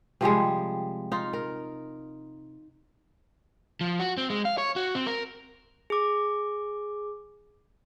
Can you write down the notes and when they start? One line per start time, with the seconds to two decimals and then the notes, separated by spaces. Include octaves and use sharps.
0.21 C3 F3 G3 G#3
1.12 D#4 F4
1.33 A#4
3.81 F3
4.00 F#4
4.18 C4
4.30 G#3
4.45 F5
4.58 C#5
4.76 F#4
4.95 C4
5.07 A#4
5.90 G#4 D6